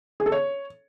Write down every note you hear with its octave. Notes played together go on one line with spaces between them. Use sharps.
G#4
A4
C#5